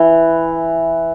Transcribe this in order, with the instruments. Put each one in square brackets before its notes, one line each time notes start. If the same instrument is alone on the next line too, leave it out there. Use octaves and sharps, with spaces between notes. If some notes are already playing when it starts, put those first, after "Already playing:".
Already playing: [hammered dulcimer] E3